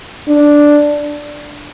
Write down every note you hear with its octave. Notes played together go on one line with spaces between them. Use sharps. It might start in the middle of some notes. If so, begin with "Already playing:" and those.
D4